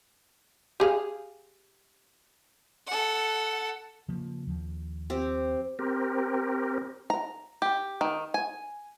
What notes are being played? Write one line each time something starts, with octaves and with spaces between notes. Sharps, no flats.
G4 G#4 F5
A4 F#5
C#3 F3 A#3
D#2 F3
C4 G4
C4 G4 A#4
A#5
G4
D#3
G#5